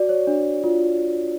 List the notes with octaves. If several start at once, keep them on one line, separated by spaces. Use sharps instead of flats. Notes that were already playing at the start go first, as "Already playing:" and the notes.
Already playing: F#4 D5
C#5
D4
F4